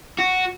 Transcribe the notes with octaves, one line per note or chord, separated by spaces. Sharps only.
F#4